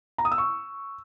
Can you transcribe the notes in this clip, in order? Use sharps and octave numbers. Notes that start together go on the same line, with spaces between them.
A#5
D#6
E6
C#6